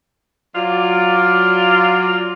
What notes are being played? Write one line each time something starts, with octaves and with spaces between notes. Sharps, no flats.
F#3 F4 D5